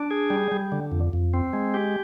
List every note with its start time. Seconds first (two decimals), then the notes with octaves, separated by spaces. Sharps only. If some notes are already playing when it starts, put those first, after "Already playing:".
Already playing: D4
0.11 G#4
0.30 G3
0.52 G3
0.72 D3
0.92 F2
1.13 F2
1.34 C4
1.53 G#3
1.74 G4